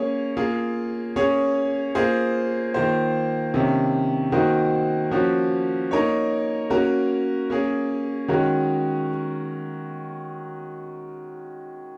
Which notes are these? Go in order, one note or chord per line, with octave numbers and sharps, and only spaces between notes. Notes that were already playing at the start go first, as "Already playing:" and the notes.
Already playing: A#3 C#4 G#4 C#5
A#3 F4 G#4
A#3 C#4 G#4 C#5
A#3 F4 G#4 C5
D#3 A#3 F4 C5
C3 D#3 A#3 C#4
D#3 A#3 D#4 F#4 C5
F3 A#3 C#4 F#4
A#3 D#4 A#4 C#5
A#3 C#4 F#4 A#4
A#3 C#4 G#4
D#3 G#3 C#4 F#4 A#4